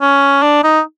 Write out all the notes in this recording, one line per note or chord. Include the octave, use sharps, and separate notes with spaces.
C#4
D4
D#4